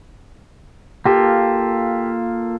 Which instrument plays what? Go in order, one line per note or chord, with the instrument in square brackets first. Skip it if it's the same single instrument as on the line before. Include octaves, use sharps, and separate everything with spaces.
[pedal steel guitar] A#3 F4 A4 [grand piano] G4